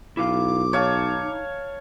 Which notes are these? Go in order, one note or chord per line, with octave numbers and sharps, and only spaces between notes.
B1 E4 A#4 F5 D6
D#4 C#5 F5 A5